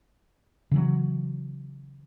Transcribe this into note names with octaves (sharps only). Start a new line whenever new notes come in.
C#3 E3 F#3